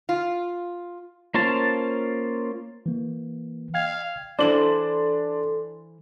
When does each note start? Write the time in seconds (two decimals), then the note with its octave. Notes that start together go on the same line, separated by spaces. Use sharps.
0.09 F4
1.34 A#3 C#4 F4 C5 A5
2.86 E3 A#3
3.74 F5 G5 G#6
4.39 E3 D4 E4 A4 C5 C6 F#7